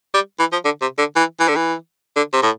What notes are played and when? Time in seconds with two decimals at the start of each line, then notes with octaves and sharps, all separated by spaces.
0.14 G3
0.39 E3
0.52 F3
0.65 D3
0.81 C3
0.99 D3
1.16 E3
1.40 E3
1.48 D3
1.56 E3
2.16 D3
2.33 C3
2.43 A2